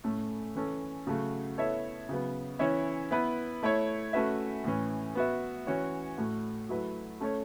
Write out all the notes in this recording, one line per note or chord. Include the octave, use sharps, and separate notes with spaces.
A2 A3 C#4 A4
E3 C#4 A4
C#3 F#3 A3 F#4
B3 E4 A4 C#5 E5
C#3 F#3 B3
E3 C#4 E4 C#5 E5
B3 E4 B4
A3 E4 C#5
A3 C#4 F#4 B4 E5
A2 E3 C#4
B3 F#4 B4 E5
E3 C#4 F#4 C#5
A2 A3 F#4
F#3 A3 E4 B4
A3 C#4 A4 C#5